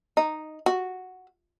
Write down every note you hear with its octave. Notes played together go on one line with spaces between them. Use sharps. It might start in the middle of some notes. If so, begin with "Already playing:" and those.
D#4
F#4